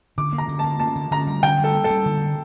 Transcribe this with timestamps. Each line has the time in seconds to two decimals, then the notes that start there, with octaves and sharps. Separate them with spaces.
0.18 D3 D6
0.33 A#3
0.38 A#5
0.48 D3
0.59 A5
0.64 A#3
0.80 A#3 A5
0.96 D3
1.11 D3 A#5
1.27 G3
1.43 D3 G5
1.59 G3 A4
1.75 A#3
1.84 A4
1.90 G3
2.05 D3
2.22 A#3